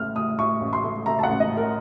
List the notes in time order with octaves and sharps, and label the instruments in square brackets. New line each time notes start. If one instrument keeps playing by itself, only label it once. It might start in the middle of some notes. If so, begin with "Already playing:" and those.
Already playing: [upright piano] A1 A2 A3 F6
A2 D#6
A2 C#6
A1
C6
A3
A3 A#5
A5
F#5
A1
D#5
A2
A#4